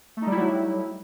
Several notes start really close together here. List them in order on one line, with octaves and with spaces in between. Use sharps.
A3 D#4 G3 E4 F#3